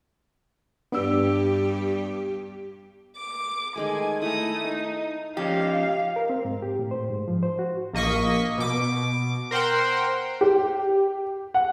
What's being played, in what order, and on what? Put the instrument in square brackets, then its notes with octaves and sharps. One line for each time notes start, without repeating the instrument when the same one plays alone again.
[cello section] G2 G3 G4 [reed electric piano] B3 D4 E6
[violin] D6
[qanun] D#3 G#3 A3 [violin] G#5
[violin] A3 D#6 [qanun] E4 G#5 A#5
[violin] D#4
[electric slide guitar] F3 C#4 D#4 [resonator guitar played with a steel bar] G4 [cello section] F5
[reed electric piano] A#4
C4
G#2
G4
A2
C5
G#2
F3
C5
F#4
[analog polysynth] A#1 A#3 D#5 C#6 B6
B2 D6
A#4 C5 F#5 G5 C6
[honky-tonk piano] G4
F#5